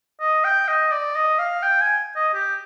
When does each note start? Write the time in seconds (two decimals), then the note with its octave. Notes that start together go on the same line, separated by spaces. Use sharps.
0.20 D#5
0.44 G5
0.68 D#5
0.92 D5
1.16 D#5
1.39 F5
1.63 G5
1.81 G#5
2.16 D#5
2.34 G4